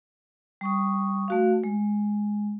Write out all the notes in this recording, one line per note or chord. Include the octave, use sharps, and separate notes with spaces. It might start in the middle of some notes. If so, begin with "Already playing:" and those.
G3 C#6 D#6
A3 F#4 F5
G#3